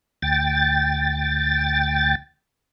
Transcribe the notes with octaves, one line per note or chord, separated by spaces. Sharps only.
D2 G5 A6